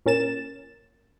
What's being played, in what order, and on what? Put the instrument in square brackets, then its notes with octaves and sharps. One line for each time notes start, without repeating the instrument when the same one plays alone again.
[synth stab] A#2 C#4 A#4 A6 E7